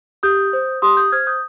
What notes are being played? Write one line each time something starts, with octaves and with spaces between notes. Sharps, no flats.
G4 D#6 G6
C5
G4 C6 D#6
D#6 G6
C5 F6 G#6
D#6 G6